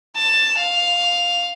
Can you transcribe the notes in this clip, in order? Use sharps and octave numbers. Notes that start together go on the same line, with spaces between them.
A5
F5